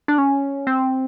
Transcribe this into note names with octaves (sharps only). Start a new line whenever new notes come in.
D4
C#4
C4